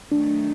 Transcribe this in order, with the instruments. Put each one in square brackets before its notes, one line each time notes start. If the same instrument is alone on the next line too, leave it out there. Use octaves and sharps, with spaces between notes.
[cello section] D#3 F#3 A3 [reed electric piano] D4